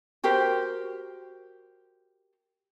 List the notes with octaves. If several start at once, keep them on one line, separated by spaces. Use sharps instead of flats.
F#4 G4 A#4 C5